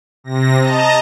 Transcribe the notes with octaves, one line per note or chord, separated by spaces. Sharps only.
C3 A#6
D#5 A5 A#5